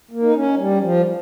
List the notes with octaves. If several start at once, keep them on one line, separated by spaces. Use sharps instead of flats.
A#3
D#4
C#4
G3
F3